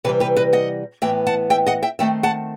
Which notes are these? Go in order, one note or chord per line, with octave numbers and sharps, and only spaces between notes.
C3 E3 G3 G4 B4
G4 B4
B4 D#5
D#5 F#5
A2 E3 B3 E5 G5
F#5 A5
E5 G5
D#5 F#5
E5 G5
D#3 A3 C4 E5 G5
F#5 A5